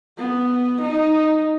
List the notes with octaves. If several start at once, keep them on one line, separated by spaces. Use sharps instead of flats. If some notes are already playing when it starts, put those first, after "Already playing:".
B3
D#4